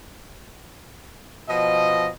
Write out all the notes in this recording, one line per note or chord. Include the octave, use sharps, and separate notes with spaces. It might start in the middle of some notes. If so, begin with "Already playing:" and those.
B2 F3 D#5